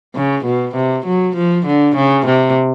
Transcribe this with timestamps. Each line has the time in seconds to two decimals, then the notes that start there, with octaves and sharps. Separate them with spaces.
0.15 C#3
0.45 B2
0.75 C3
1.06 F#3
1.36 F3
1.66 D3
1.96 C#3
2.26 C3